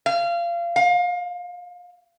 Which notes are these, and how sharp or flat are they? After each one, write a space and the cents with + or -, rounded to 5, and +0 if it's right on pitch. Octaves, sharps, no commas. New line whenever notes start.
F5 -25
F5 +30